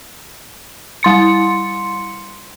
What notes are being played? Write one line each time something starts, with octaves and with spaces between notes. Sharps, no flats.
G3 C6 C#7